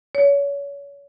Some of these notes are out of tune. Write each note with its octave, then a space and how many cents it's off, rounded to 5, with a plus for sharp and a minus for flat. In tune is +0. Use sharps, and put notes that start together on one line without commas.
C#5 +30